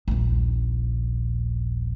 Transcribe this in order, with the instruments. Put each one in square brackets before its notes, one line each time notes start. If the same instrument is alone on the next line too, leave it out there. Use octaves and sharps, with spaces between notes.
[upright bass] D#1 A#1